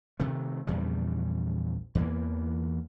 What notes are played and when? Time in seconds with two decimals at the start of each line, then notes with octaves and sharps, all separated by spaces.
0.20 C3 D#3 A3
0.67 A#1 E2 C#3 G3
1.95 E2 E3 A#3